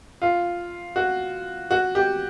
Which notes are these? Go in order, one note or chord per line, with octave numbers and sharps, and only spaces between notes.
F4
F#4
F#4
G4